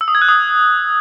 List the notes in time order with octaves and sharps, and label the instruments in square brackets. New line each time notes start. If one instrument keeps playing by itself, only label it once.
[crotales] E6
D#6
G#6
F#6
D#6